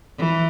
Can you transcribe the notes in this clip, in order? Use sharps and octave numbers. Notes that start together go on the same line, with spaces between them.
E3